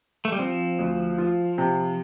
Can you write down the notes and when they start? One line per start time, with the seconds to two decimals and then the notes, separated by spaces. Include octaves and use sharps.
0.25 A3
0.32 G3
0.39 F3 C4
0.79 D2
1.18 F4
1.58 C3